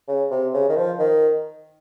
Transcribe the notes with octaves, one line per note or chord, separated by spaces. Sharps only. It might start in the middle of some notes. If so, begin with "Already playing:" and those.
C#3
C3
C#3
D#3
F3
D#3